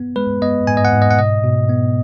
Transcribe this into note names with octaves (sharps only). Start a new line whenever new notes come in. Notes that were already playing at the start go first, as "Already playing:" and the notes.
Already playing: B3
G#3 B4
B3 D#5
G#2 G#5
D#5
F#5
G#2
D#5
F#5
B2 D#5
B2
B3